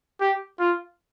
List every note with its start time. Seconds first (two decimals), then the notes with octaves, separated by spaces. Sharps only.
0.21 G4
0.59 F4